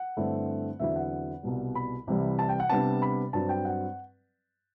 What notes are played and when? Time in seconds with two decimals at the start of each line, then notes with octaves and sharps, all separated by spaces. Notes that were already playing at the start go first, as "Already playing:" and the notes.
Already playing: F#5
0.17 G2 D3 A3 C4 E4
0.80 E2 D3 F#3 C4 E4 E5
0.96 F#5
1.43 C2 B2 G3
1.75 B5
2.07 C2 C3 E3 G3
2.39 A5
2.49 G5
2.60 F#5
2.69 C3 G3 B3 D4 A5
3.02 B5
3.33 G2 F#3 C4 A5
3.49 G5
3.65 F#5